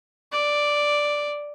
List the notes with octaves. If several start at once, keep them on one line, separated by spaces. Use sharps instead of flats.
D5